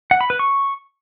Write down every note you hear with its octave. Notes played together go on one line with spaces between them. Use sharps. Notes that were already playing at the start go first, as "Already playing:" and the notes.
F#5
B5
B4
C#6